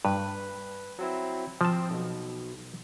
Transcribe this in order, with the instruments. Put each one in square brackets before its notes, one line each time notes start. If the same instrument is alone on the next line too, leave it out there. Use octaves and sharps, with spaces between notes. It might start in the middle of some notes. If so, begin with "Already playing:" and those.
[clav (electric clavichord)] G2 [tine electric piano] B4
[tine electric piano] F#3 C4 E4
[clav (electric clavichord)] F3 A5 [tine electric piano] C4
[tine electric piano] B1 B2